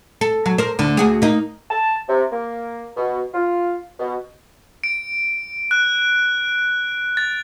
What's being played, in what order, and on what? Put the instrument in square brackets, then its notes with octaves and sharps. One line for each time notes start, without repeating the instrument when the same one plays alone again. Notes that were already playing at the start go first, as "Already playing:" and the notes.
[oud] A4
F#3
A#4 C5
D2 D3
D2 F#4 G#4
A#3 D#4
[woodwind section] A5
C3
A#3
B2
F4
B2
[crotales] D7
F#6
A6